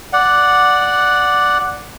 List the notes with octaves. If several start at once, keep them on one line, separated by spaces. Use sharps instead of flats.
D5 F#5